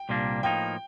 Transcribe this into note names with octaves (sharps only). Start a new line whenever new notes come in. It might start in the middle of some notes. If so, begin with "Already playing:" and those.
Already playing: G5
C2 A#2 G3 A#3 D4
A2 F3 A#3 D#4 G5